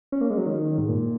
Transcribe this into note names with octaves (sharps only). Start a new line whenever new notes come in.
C#4
A#3
G#3
F#3
D#3
G#2
A#2